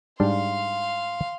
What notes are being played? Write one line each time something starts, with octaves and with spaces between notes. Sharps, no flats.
G#2 G3 D4 F5 C6